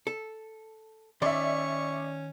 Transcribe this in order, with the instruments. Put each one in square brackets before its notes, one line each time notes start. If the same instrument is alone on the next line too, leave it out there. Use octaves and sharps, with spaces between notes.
[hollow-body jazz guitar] A4
[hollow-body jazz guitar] D#3 C6 [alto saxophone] C#4 [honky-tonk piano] D5 E5 [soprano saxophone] C#6